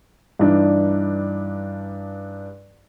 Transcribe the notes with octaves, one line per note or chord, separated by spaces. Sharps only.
G2 E3 D4 D#4